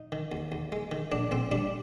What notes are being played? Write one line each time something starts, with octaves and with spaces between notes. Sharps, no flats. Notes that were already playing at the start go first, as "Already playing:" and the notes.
Already playing: D#4
D#3
D#2
D#2
G#3
D#3
A#1 D4
A#1 C4
G3 D4